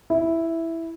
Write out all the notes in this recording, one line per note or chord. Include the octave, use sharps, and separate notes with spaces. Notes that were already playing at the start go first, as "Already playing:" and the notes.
E4